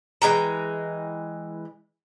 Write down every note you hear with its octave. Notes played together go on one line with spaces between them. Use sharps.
E3 G#3 G5 A#5